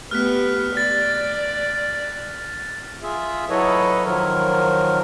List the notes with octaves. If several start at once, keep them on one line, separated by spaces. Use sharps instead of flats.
A3 B3 G4 F6 F#6 B6
D5 A6
F4 G#4 E5
F#3 E4 A4 B4 C#5 D#5
D#3 F3 F#3 A#4